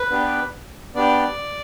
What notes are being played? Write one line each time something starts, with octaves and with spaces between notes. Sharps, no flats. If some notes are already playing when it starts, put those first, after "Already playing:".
Already playing: B4
B3 D4 G4
B3 D4 G4 D5